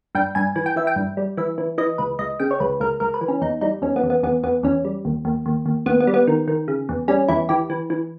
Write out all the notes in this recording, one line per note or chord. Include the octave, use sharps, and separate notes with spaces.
G2 G5
G2 G#5
E3 G#5
G5
E3 E5
G5
G2
G3
E3 E5
E3
E3 D#5
C#2 B4
C#2 D#5
C#3 G5
C#5
C#2 B4
C#2 A#4
C#2 A#4
B4
E3
C#4
E2 D#4
G3 D#4
E2 C#4
B3
E2
B3
E2 B3
E2 B3
E2 C#4
G3
D#2
D#2
D#2
D#2
D#2 B3
B3
G3
B3
D#3
D#3
C#3
E2
G3 C#4
E2 E4
E3 G4
E3
E3